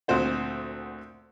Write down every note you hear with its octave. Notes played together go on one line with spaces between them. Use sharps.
D2 A#2 C4 C5 F#5